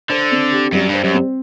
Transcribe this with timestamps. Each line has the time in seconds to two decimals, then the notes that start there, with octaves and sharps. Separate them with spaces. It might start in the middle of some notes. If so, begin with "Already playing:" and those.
0.10 D3 C5
0.32 C4
0.52 G4
0.72 F#2 G3
0.89 G2 C5
1.04 F#2
1.14 C4